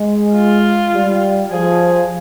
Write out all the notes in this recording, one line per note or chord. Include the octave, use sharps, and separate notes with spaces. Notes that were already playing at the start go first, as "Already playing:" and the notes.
Already playing: G#3
F4
G3
F3 G#4